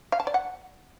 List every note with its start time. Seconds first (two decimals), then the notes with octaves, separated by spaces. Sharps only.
0.12 F5
0.20 A5
0.27 D5
0.34 F#5